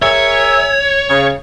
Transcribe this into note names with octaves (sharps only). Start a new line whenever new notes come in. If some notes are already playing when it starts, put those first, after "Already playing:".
G#4 A#4 C#5 E5
C#3